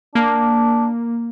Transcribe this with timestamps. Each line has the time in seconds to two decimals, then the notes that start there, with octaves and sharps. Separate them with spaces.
0.15 A#3 D4